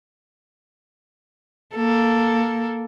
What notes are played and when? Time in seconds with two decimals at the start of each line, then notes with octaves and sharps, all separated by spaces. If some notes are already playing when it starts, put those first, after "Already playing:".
1.75 A#3 A4